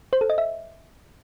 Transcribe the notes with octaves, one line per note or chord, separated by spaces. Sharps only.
C5
A4
D#5
E5